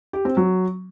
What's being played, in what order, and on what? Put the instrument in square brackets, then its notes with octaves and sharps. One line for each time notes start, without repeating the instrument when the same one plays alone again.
[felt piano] G4
C4
F#3